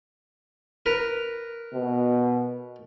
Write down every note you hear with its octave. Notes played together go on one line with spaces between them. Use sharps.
A#4 B4 A#5
B2